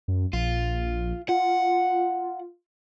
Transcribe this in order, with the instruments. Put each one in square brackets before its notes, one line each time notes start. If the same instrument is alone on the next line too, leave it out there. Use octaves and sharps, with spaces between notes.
[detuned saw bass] F#2
[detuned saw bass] A#1 [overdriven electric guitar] F4
[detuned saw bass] F4 [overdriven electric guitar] F#5